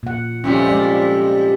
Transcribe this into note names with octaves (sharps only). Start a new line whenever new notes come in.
A#2 F#5
F2 C3 G3 C#4 F4
G#3 D5